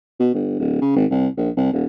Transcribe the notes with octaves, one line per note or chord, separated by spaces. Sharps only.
B2
G1
D1
C#3
G#1
C2
A#1
C2
D#1